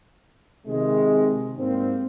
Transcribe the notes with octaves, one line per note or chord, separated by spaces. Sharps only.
C3 D#3 G#3
G#2 G3 A#3 C4